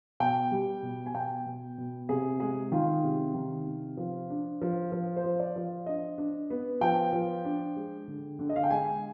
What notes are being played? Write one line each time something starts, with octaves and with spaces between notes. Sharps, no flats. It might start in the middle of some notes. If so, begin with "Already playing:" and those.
B2 G5
G3
B2
G#5
B2 G5
B2
B2
C3 G#4
G#3 G#4
D#3 F4
C3
D#3
C3
F3
D4
F3
F3
C5
F3
D5
F3
D4 D#5
D4
B3
F3 G5
F3
D4
G#3
D3
D3
D#5
F5
G5
G#3 G#5